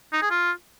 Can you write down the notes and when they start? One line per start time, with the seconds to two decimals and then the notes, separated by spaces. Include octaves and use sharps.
0.13 D#4
0.22 G#4
0.31 F4